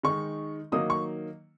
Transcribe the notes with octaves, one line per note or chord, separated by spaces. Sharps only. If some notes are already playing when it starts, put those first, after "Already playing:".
D#3 G#3 D#4 C#6
D#3 F#3 A#3 D#4 D#6
C#6